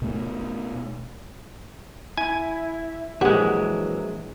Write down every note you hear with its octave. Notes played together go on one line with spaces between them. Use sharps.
B2 A3
E4 G#5
A#1 E3 F#3 G#3 G4 E5 F#5